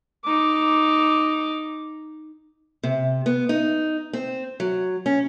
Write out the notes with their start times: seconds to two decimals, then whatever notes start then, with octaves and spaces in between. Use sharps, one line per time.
0.24 D#4 D6
2.83 C3
3.26 B3
3.49 D#4
4.13 C4
4.60 F#3
5.06 C#4